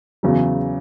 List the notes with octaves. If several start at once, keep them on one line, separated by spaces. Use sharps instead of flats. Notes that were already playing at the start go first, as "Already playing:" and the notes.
E2 C#3 F#3